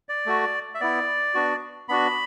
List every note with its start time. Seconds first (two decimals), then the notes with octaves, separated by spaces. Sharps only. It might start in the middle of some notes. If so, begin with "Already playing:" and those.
0.09 D5
0.26 A3 F#4
0.75 E5
0.80 B3 E4 D5
1.34 B3 D4 F#4
1.89 B3 D4 F#4 B5